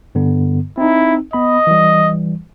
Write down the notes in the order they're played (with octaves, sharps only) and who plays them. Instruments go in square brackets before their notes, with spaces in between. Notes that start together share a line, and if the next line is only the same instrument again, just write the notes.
[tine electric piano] G2 D3 B3
[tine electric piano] C4 D#4 [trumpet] E4
[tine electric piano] B3 B5 [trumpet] D#5
[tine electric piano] E3 G3